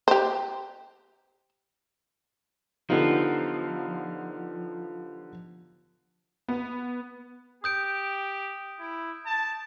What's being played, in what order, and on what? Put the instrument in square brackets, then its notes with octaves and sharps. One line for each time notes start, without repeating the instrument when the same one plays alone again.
[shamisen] G4 C5
[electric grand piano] D3 B3 D#4 [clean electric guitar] F3 [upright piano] F4 G4
[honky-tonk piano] B3
[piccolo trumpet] G4 [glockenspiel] D#6 G6 D7
[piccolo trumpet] E4
A5